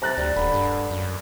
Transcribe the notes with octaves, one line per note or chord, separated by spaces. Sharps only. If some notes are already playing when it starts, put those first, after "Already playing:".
C3 A#5 F#6 A6
D2 G3
D#1 D3 B5
G2
F#2